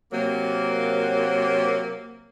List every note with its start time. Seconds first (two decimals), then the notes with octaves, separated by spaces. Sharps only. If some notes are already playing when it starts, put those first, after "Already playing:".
0.12 C3 F#3 A#3